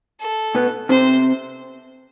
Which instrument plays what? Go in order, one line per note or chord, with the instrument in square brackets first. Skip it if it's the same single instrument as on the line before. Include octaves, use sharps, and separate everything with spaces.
[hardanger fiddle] A4
[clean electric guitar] B2 B3
[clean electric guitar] C3 C4 [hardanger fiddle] C5